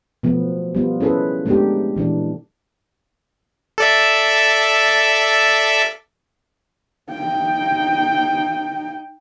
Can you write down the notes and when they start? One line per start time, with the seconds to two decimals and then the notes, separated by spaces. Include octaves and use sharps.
0.23 B2 F3 A3 B3
0.75 G3 B3 F4
1.00 C#4 E4 G#4 A4 B4
1.46 G#3 A3 B3 D4 D#4 G4
1.96 A#2 E3 D4
3.78 A4 D5 E5
7.11 D#4 G5